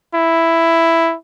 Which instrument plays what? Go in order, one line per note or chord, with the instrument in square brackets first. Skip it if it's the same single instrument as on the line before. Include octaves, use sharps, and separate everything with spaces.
[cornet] E4